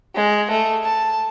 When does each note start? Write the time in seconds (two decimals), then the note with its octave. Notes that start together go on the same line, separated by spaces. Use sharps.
0.15 G#3
0.50 A3
0.84 A5